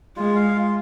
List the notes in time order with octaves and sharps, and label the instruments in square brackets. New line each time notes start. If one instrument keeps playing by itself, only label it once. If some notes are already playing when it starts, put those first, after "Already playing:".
[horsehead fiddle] G#3 [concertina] F4
[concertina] F5
F4